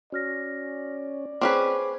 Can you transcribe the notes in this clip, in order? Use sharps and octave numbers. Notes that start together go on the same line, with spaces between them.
C#4 F#4 D5 F6 A#6
C4 C#4 G#4 B4 C5 D6